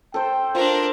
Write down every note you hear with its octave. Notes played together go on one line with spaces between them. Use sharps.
A4 C5 G5
D4 F4 A#4 C5